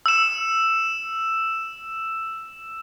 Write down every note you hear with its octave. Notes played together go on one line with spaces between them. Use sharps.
E6 E7